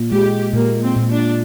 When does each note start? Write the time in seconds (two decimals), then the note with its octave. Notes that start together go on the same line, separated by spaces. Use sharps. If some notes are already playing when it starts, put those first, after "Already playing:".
Already playing: A#2
0.12 G#3 G4
0.54 A#2 A#3
0.82 C4
0.96 A#2
1.10 D4